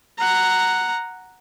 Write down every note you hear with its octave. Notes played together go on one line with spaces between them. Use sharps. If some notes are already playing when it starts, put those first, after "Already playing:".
F#5 A#5